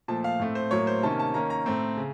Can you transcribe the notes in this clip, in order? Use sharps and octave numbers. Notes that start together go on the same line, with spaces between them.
A#2 F3 A3 A5
F5
A2 A3 C4
C5
A2 F#3 A#3 C#5
C5
C3 D#3 A#3 C#4 A5
A5
D#3 A#3 C#4 A#5
A#5
A2 A3 C4
C#3